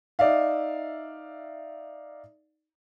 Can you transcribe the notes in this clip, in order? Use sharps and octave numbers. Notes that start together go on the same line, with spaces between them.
D#4 D5 E5 F5